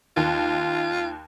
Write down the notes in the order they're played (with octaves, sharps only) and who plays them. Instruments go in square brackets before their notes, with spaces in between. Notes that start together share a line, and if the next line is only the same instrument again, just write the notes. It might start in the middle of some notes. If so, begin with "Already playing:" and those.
[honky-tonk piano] D#2 [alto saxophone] F4